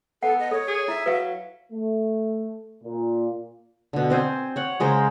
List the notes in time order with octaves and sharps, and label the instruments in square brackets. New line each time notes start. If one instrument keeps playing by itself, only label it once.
[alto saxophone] B3 [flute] A4 [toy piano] F#5
[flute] D#5
[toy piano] A4 [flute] C#5
[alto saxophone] G#4
[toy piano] E4 [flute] E5
[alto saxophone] F#3 [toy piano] B4 F5
[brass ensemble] A3
A#2
[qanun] B2 D3
C4 C5 G#5
C#5 F#5
C#3 G#3 A#4 C5